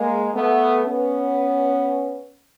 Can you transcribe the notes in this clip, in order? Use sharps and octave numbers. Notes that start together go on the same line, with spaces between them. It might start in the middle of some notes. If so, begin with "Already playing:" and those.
Already playing: G#3 A#3
A3 B3
B3 C#4